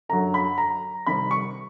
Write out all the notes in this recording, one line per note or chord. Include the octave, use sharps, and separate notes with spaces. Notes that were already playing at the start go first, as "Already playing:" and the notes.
F#2 D3 F#3 A#5
B5
A#5
C3 D#3 G3 C4 B5
C#6